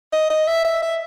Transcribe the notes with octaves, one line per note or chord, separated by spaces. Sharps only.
D#5
D#5
E5
E5
E5